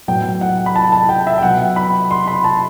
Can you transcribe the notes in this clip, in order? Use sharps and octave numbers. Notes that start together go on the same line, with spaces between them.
A2 F#3 B3 G5
F#5
B5
A5
A5
G5
E5
G5
B2 F#3 B3 F#5
B5
C6
B5
A5